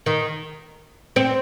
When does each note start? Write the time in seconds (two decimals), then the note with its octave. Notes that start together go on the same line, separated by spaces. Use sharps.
0.06 D#3
1.16 C4